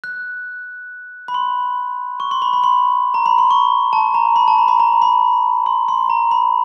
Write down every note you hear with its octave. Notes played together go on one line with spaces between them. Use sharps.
F#6
B5
C6
C#6
C6
B5
B5
C6
A#5
B5
C6
C#6
A5
A#5
B5
A5
A#5
B5
A#5
B5
C6
C6
A#5
B5